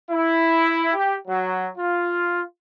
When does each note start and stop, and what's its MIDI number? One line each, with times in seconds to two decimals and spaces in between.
0.10 0.92 64
0.94 1.14 67
1.27 1.67 54
1.77 2.41 65